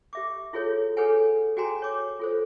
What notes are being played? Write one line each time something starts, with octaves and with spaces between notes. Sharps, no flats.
G4 E5 D6
E4 F4 G#4 A4 C#5
G#4 A4 B4 C#5 F#5 G#5
F#4 G#4 G5 G#5 A#5 C6
C#5 D6
F4 A4 C5